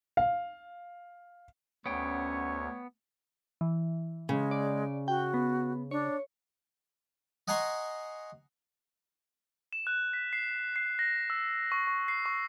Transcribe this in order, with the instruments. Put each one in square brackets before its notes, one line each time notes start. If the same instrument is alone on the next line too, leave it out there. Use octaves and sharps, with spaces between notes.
[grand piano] F5
[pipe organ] D2 [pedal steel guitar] B3 G5 [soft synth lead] C#4 [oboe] C#5
[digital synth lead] E3
[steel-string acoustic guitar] C#3 [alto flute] G#3
[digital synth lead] D5
[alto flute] F#4 [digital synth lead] G5
[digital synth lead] B3
[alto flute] D4 [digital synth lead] C#5
[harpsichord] D#5 F#5 G#5 A#5 C6 C#6
[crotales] E7
F#6
B6
C7
C7
A#6
E6
C#6
C#6
C7
C#6